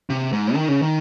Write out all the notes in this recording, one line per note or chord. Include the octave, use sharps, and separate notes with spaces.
C3
G#2
D#3
C#3
D#3